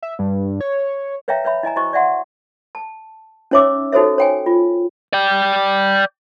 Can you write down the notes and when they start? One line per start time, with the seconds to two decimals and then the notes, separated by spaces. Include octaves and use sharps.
0.03 E5
0.19 G2
0.61 C#5
1.28 B4 C#5 E5 F5 G5 A#5
1.44 B4 C#5 E5 B5
1.63 E4 D#5 G#5 A#5
1.76 E4 F#4 C5 D#5 C#6
1.93 D5 E5 F#5 C6
2.75 A5
3.51 C#4 D#4 C#5 E5 D6 E6
3.92 D#4 F#4 A4 C5 C#5 E5
4.18 C#5 G5 G#5
4.46 F4
5.13 D5 G5